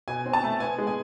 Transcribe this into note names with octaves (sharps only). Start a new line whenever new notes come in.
B2 G#5
C4
A5
A3
B3 G#5
G#3
G#5